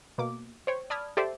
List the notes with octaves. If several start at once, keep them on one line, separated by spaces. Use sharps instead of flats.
B2 A#3 D6
C5 C#5 G5
D5 A5 B5 D#6 F6 G#6
G4 A4 C5 D5 E5